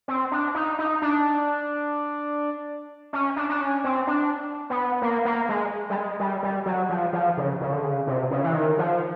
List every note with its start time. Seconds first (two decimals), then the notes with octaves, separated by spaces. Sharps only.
0.08 C4
0.32 D4
0.55 D#4
0.79 D#4
1.02 D4
3.13 C#4
3.36 D4
3.49 D4
3.61 C#4
3.84 C4
4.07 D4
4.70 B3
5.02 A#3
5.25 A#3
5.49 G#3
5.90 G3
5.96 G#3
6.20 G3
6.43 G3
6.66 F#3
6.89 F3
7.13 F3
7.37 C#3
7.61 C#3
7.72 D3
7.84 C#3
8.07 C3
8.31 C#3
8.44 E3
8.54 D#3
8.78 F3